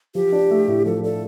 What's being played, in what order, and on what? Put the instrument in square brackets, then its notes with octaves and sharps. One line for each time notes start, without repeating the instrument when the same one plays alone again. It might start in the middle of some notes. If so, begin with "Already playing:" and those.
[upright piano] F3 [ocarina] G4
[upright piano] D4
A3
A2
[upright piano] F3 [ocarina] A4
[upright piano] D4 [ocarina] A4